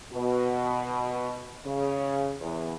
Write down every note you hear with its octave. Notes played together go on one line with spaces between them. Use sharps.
B2
C#3
E2